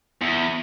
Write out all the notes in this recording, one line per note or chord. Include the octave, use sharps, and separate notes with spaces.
E2